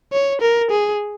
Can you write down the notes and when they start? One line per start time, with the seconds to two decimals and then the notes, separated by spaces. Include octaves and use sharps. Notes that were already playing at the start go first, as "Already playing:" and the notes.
0.12 C#5
0.41 A#4
0.71 G#4